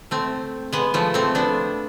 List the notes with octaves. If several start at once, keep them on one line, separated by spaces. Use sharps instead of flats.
A3 C4
G#3 B3
F3 A3
A3 C4
B3 D4